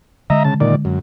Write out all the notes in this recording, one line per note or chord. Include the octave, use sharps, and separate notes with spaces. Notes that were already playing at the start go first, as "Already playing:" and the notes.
D3 G#3 D#5 E5 A#5
C#3 A5
A#2 D#3 D5
F#2